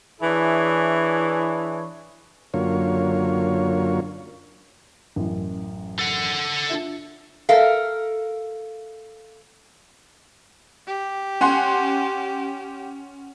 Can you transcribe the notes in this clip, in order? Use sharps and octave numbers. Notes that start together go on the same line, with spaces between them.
E3 D4 E4 G#4 C#5
F#2 D3 F#3 A#3 F4 C#5
A1 F#2
A4 F#5
D4 F4 E5
A4 A#4 E5 F5
G4
C#4 F#5 C6